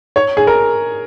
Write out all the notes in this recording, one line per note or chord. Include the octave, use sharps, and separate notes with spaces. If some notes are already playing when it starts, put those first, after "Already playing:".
C#5
G#4
A#4